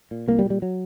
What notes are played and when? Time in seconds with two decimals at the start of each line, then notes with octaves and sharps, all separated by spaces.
0.11 A#2
0.28 C2 A#3
0.39 G3
0.45 A#2
0.50 G3
0.62 F#3